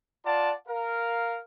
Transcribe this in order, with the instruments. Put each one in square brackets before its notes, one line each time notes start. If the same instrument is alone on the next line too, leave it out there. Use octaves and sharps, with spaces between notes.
[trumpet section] F4 D5 F#5 A5
A#4 F5